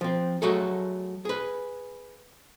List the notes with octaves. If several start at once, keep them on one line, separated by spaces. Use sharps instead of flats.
F3 C4
F#3 A3 F#4 G#4 A4
G#4 B4